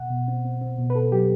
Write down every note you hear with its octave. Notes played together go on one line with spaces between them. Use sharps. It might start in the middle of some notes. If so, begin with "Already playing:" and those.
Already playing: B2 F#5
B2
C4
C4
C4
B2
B4
B2 A4
F#3 G4